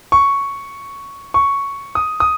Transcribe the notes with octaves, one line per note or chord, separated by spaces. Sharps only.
C#6
C#6
D#6
D#6